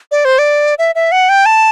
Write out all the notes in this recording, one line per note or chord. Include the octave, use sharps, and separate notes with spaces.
D5
C5
D5
E5
E5
F#5
G5
A5